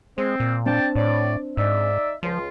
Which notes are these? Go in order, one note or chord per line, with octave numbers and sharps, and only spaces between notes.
G#3 C4
A#2
C4 D4 D5 G5 A5
A2 C#5 D5
G#2 D#4 D5 E5
C#2 F3 F4